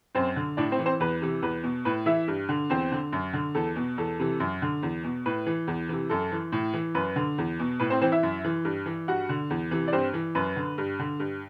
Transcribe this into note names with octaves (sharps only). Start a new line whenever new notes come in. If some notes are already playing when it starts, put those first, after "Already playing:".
F#2 C4 C5
D3
A2 D4 D5
C4 C5
E3
C4 C5
E2 B4
C3 E3
E2 B4
B2
A2 B4
E3 E4 E5
G2
D3
E2 C4 C5
D3
F#2
D3
E2 A4
B2
E2 A4
C3 E3
F#2
D3
E2
B2
A2 B4
E3
E2
C3 E3
F#2 A4
E3
A2
E3
F#2 B4
D3
E2
B2
A2 B4
C4 C5
E3 C4 C5
E4 E5
F#2
E3
G2
E3
G2 F#4 F#5
D3
E2
C3 E3
D5
G2 C4 C5
E3
F#2 B4
D3
G2
D3
G2